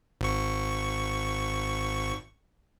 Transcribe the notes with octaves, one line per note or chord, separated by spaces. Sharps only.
G#1 C#6